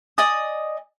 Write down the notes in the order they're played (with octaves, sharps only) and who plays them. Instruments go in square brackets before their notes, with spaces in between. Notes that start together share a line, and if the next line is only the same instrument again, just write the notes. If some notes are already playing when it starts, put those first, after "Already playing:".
[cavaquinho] D5 D#5 G#5 D#6